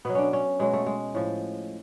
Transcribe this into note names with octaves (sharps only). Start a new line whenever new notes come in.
B2 F#3 B3
C#4 D4
C#4
B2 F#3 G#3
A3
G#3
A2 F3